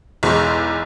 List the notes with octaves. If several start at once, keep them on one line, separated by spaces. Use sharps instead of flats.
B1 E2 G#3